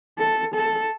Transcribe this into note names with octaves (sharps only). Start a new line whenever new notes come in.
A4
A4